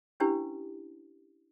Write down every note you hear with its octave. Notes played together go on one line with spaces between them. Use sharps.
C#4 D4 E4 G4 B4